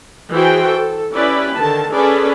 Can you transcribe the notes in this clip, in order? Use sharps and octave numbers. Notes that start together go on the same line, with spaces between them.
E3 F#4 G#4 C5 G5
A4
C#4 E4 G4 B4 D5
D3 D#3 A5
C#4 G#4 A4 B4 D5